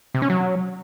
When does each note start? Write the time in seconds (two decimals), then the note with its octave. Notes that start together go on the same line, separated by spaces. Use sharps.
0.14 C3
0.22 C#4
0.30 F#3